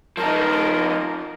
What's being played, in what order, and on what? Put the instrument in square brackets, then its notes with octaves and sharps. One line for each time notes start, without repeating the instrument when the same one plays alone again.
[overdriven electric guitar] F3 D#4 [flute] A#4